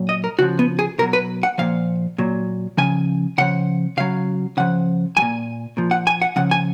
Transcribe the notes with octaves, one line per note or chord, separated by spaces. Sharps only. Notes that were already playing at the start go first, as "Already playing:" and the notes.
Already playing: A#2 F#3
D#5
A#4
C#3 F3 F#4
B3
G#4
B2 F#3 A#4
B4
F#5
A#2 F3 F5
A#2 F#3
C#3 F3 G#5
C#3 F3 F#5
C#3 F#3 F5
C#3 F3 F#5
F#3 G#5
A#2
A#2 F3
F#5
G#5
F#5
C#3 F3 F#5
G#5